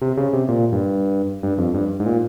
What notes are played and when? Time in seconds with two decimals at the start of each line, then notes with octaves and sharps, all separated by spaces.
0.02 C3
0.17 C#3
0.33 C3
0.49 A#2
0.72 G2
1.43 G2
1.58 F2
1.74 G2
2.00 G#2
2.06 A#2